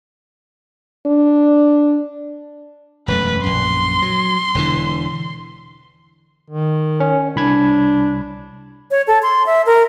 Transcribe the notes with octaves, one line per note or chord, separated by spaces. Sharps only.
D4
E1 F#2 A3 B4
A#1 F#2 C6
F#3
E1 D3 E3
D#3
C#4
C2 D4 B5 G#6
C#5
A4
C6
E5
A#4